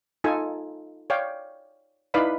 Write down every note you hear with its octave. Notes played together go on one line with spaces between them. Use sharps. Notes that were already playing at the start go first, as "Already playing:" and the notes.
D#4 F4 A4 G#5
C#5 D5 F5 G5
D#4 E4 B4 D5 F5 B5